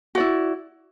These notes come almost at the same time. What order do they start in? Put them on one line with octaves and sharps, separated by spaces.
F#4 D5 E4